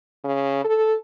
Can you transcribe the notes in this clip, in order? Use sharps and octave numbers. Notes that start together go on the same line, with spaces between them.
C#3
A4